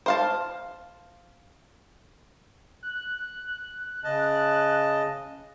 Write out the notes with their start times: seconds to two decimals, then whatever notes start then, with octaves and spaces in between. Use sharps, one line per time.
0.06 C5 F5 A5
2.83 F#6
4.04 C#3 D#5 A5